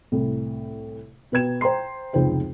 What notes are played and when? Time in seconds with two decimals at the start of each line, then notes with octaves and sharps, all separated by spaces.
0.12 C2 A2
1.32 B2 B4 G5 G#6 E7
1.61 C5 G5 A#5 C6 C7
2.13 F1 C#2 D#4 C5 G5